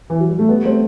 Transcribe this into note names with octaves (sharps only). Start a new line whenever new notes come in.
E3
F#3
G3
A3
G3 B3
A3 C4